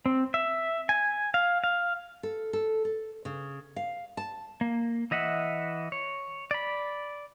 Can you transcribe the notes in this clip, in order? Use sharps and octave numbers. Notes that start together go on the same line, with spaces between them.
C4
E5
G#5
F5
F5
A4
A4
A4
C#3
F5
A5
A#3
E3 D#5 E5 F#5
C#5
D5 B5